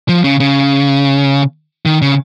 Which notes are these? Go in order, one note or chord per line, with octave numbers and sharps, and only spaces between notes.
F3
C#3
C#3
D#3
C#3